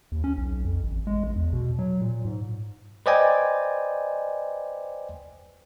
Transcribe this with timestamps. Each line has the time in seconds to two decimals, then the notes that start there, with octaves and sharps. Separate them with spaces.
0.12 D#2
0.24 C#4
0.38 B1
0.65 F2
0.84 A1
1.07 G#3
1.23 A#1
1.36 E2
1.53 B2
1.79 F#3
2.02 A#2
2.25 G#2
3.06 B4 C5 D5 D#5 G5 G#5